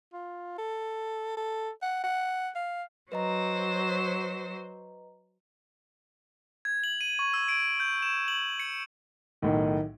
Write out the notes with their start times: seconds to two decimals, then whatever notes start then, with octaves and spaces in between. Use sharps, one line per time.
0.13 F4
0.58 A4
1.37 A4
1.82 F#5
2.04 F#5
2.56 F5
3.12 F#3 B4 C5 D#5 A#5
6.65 G#6
6.84 F#7
7.01 D#7
7.19 C#6
7.34 E6
7.48 D7
7.80 G6
8.02 E7
8.28 F#7
8.60 C#7
9.43 B1 A2 D#3